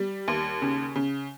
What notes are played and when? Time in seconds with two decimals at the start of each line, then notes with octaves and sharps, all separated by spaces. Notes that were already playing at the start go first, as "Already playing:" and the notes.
Already playing: G3
0.28 D#2
0.62 C#3
0.95 C#3